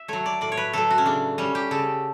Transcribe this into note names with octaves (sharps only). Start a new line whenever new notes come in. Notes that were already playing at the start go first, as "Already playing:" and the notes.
Already playing: E5
F#3 A3 C#5
D5
A2 D5
C#5
B4
F#3 A3 A4
F#4
C#4
C#3 D4
G3 C#4
G4
C#3 A4